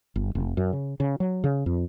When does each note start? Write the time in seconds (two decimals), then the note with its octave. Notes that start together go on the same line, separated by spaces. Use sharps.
0.16 G1
0.35 F1
0.57 F#2
0.73 C#3
1.00 C#3
1.20 F#3
1.44 C#3
1.66 F2